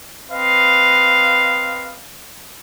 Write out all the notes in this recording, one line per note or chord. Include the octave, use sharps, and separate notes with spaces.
C4 B4 D#5 F5